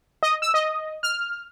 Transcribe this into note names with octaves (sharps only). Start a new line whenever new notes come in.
D#5
E6
D#5
F6